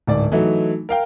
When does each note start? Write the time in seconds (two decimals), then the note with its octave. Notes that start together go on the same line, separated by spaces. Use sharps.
0.07 D1 G#2 D5
0.32 E3 F#3 A3 D#4
0.89 A#4 F5 G5